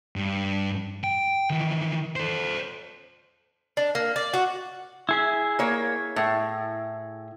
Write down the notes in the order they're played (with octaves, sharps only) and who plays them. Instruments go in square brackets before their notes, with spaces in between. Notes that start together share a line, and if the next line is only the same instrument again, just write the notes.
[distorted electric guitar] G2
G5
D#3 E3
A4 C5
[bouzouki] D4
A#3
D5
F#4
[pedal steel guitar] E4 G#4 E5
[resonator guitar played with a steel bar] A#3 C#5
A2